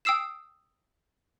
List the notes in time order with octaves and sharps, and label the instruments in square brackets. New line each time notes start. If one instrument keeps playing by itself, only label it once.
[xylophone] G5 D#6 E6 C7 E7